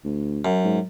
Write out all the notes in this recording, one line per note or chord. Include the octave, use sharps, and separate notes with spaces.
D2
F#2
G#2